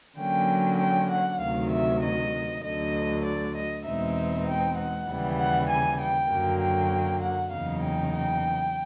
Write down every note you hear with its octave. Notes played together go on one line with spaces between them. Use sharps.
D3 F#3 A#3 C#4 G5
G5
F#5
D2 C3 D#3 F#3 F5
E5
D#5
D2 D3 F#3 D#5
D5
D#5
E2 B2 G#3 C4 D#4 E5
G5
F#5
D#2 C#3 E3 G3
F#5
G#5
G5
F#2 D3 F#3 A#3
G5
F#5
E2 C#3 F#3 A#3 D#4 F5
G5
G5